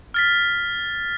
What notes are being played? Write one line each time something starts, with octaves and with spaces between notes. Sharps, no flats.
F6 A6 B6